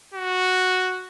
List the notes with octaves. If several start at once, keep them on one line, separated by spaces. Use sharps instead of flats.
F#4